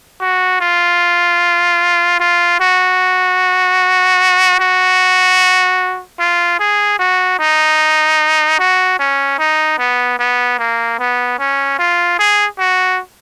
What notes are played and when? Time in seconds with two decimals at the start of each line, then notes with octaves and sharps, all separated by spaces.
0.20 F#4
0.61 F4
2.20 F4
2.60 F#4
4.60 F#4
6.19 F4
6.59 G#4
6.99 F#4
7.39 D#4
8.59 F#4
8.99 C#4
9.39 D#4
9.79 B3
10.19 B3
10.59 A#3
10.99 B3
11.39 C#4
11.78 F4
12.19 G#4
12.59 F#4